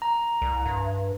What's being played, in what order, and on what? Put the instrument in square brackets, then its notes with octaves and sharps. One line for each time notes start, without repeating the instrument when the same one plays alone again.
[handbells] A#5
[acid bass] C2
G2